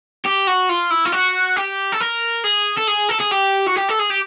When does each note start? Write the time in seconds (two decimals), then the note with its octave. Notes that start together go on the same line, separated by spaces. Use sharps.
0.25 G4
0.47 F#4
0.69 F4
0.91 E4
1.06 F4
1.13 F#4
1.57 G4
1.92 A4
2.00 A#4
2.44 G#4
2.78 A4
2.88 G#4
3.10 A4
3.21 G#4
3.32 G4
3.67 F#4
3.76 G4
3.89 A4
3.99 G#4
4.10 G4